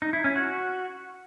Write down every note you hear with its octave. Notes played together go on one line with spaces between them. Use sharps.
D#4
E4
C#4
F#4